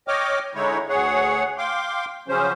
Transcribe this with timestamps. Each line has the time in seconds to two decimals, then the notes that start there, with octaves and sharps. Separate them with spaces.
0.08 C#5 D#5 G5 D6 F6
0.55 D3 G#3 D#4 E4 C#5
0.89 D2 G#4 C#5 F#5
1.58 F5 G5 C6 D6
2.28 C#3 F3 F#3 C#4 C5